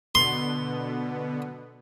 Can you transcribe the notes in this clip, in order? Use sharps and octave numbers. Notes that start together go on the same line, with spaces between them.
B2 D3 B3 C6